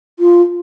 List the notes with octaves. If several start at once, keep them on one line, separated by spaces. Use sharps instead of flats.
F4